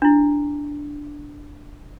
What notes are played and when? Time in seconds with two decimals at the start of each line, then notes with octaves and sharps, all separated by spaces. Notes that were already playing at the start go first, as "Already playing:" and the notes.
0.02 D4 E4